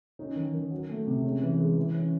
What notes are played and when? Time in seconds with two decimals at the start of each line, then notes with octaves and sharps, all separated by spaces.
0.19 C#4 D#4
0.36 D#3
0.53 D#3
0.71 F#3
0.90 A3
1.07 C3
1.24 G#3 C#4
1.42 E3
1.59 G#3
1.76 E3
1.95 C#4